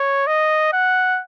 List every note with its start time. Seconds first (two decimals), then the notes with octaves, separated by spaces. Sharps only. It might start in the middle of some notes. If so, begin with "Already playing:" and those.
Already playing: C#5
0.27 D#5
0.73 F#5